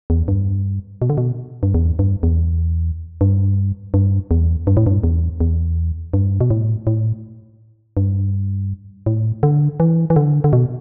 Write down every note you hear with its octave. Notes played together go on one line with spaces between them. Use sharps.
E2
G2
B2
D3
B2
G2
E2
G2
E2
G2
G2
E2
G2
A2
G2
E2
E2
G2
B2
A2
A2
G2
A2
D3
E3
E3
D3
D3
B2